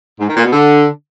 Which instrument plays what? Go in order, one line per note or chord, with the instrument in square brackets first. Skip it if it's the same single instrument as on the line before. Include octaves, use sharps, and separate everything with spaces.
[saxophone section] G#2
D#3
A#2
B2
D3